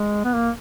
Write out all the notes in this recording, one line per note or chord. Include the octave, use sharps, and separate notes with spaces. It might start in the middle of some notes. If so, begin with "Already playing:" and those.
Already playing: G#3
B3
A#3